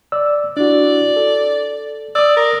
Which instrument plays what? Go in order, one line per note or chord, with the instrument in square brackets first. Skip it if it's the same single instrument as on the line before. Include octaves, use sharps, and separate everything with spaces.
[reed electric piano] D5 E6
[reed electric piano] D4 E4 F#4 [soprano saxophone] D5
[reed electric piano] A4
[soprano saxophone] D5 [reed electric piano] D#6 E6
[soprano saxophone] A#4